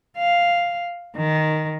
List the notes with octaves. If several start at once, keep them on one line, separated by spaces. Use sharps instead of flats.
F5
D#3